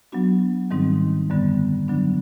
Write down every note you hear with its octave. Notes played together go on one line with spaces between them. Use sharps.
F#3 B3 D4 F#4
G#2 D#3 G3 C4 D#4
F#2 D3 G3 B3
D3 F#3 B3 D4